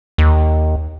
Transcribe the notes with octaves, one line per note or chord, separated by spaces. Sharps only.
D#2